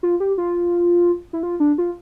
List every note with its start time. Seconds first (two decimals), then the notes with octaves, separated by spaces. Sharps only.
0.03 F4
0.20 G4
0.38 F4
1.33 E4
1.43 F4
1.60 D4
1.78 F4